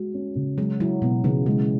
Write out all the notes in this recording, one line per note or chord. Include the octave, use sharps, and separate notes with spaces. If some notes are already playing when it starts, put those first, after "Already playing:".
Already playing: G#3 F#4
C#4
C#3
F#3 G#3
F#3 E4
B2 B3
C#3 E3
C#3 G#3